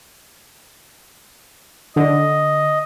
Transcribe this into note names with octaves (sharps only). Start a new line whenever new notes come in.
D3 D#5